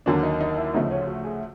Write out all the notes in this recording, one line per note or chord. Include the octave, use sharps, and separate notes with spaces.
D#2 D3 F#3 A#3 D4
D#4
D#4
E4
D2 C#3 F3 A3 D#4
C#4
F4
F#4
G#4